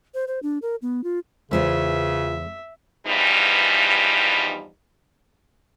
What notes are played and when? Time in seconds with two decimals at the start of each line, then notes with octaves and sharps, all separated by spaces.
0.14 C5
0.28 C5
0.43 D4
0.62 A#4
0.82 B3
1.04 F4
1.51 E2 C#3 E3 G#3 F4 F#4 C5 E5
3.06 E2 G2 E3 F3 G3 D#4